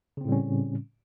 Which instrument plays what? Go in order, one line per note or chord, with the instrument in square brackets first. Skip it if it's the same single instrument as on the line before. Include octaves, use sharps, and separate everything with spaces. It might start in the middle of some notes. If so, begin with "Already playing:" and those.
[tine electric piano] C#3
C4
A2
G3
C#4